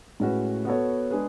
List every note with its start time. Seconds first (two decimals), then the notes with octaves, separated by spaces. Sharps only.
0.20 A2 G#3 C#4 F#4 B4
0.65 B3 F#4 A4 C#5
1.11 G#3 D4 G#4 B4